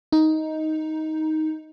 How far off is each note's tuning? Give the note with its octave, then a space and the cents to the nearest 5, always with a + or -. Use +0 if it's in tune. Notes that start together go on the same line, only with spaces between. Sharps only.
D#4 +10